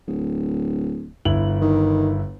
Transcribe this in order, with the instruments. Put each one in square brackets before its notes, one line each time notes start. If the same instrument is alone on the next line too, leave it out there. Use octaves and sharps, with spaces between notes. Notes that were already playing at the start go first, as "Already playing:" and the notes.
[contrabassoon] D1
[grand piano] G1 E4 F#7
[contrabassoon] D#3